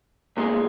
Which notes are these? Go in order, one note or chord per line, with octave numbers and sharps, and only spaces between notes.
B1 A#2 G#3